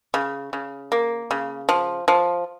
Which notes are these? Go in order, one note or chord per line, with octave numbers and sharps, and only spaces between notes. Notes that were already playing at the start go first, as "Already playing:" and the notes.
C#3
C#3
A#3
C#3
F3
F3